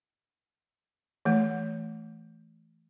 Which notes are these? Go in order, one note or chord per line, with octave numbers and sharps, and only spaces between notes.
E3 A3